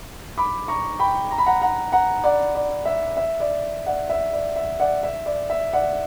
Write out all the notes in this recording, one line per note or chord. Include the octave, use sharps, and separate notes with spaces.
B5 D6
A#5 C#6
G5 B5
A#5
B5
F#5 A#5
F#5 A#5
F#5 A#5
D5 F#5
D5
E5
E5
D5
D5 F#5
E5
D5
E5
D5 F#5
E5
D5
E5
D5 F#5